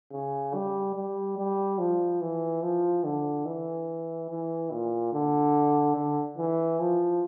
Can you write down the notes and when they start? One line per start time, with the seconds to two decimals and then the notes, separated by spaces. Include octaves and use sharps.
0.12 C#3
0.54 G3
0.95 G3
1.38 G3
1.79 F3
2.21 E3
2.62 F3
3.04 D3
3.46 E3
4.29 E3
4.72 A#2
5.13 D3
5.95 D3
6.38 E3
6.80 F3